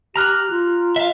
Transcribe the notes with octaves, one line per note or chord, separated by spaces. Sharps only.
G4 A#5 F6 F#6
F4
E5 F5